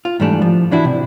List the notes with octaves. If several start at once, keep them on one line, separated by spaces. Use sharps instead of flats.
F4
G#2 E3 G3 A3 D4
F3
E3 D4 E4 F#4
C3